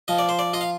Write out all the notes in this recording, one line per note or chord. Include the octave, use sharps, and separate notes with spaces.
F3 D#5
D5
C5
D5
F4 D#5
F5